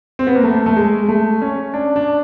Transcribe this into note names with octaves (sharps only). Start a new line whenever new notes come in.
C4
B3
A#3
A3
A3
G#3
A3
C#4
D4
D4